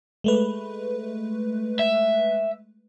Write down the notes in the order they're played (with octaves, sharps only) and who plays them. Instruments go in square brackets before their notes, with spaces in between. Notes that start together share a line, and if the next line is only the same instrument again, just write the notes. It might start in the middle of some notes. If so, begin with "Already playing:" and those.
[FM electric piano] G#3 A3 B4
[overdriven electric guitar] E5